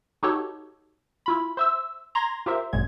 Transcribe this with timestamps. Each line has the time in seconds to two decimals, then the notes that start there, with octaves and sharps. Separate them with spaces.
0.23 D#4 F#4 G4 A4 C#5
1.26 E4 F4 B5
1.57 C5 E5 E6
2.15 A#5 C6 G#6 A#6
2.46 F4 G4 A#4 C5 E5
2.73 G#1 F#2 A#2 G#3 G#6